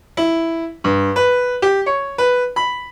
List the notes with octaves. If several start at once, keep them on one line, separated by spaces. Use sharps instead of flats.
E4
G2
B4
G4
C#5
B4
B5